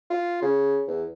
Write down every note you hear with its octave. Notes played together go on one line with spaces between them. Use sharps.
F4
C#3
E2